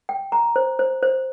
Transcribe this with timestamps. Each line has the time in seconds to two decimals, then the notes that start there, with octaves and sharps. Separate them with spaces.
0.09 G5
0.32 A#5
0.56 C5
0.79 C5
1.03 C5